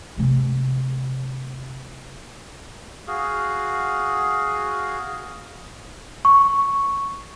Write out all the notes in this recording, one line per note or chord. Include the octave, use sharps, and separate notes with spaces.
C3 A3
F#4 G#4 F5
C#6